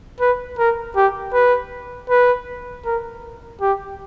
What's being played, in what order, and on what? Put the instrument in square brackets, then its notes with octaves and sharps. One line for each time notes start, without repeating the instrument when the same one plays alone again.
[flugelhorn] B4
A#4
G4
B4
B4
A#4
G4